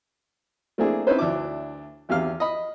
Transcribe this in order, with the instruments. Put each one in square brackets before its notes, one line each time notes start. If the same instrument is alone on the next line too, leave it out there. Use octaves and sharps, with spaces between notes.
[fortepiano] A3 A#3 C4 D4 E4 G#4
C4 C#4 D#4 E4 B4 C5
D2 D4 E4 D6
G#1 E2 G4 F5 F6
D#5 B5